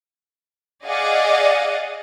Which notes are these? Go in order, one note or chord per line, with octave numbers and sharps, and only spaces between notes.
G#4 D5 D#5 F5 F#5